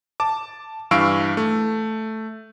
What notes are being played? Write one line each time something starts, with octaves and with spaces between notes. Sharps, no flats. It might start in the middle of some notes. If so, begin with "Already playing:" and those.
A5 D6
G2 E3 F5 C#6 E6 D7
A3